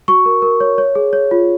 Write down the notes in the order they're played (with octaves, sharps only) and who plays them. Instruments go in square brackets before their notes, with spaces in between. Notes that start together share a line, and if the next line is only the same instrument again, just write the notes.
[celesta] F#4 C#6
A#4
A#4
C#5
C#5
G#4
C#5
F4